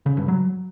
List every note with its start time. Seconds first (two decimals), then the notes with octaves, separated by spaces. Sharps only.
0.06 C#3
0.17 G2
0.28 F#3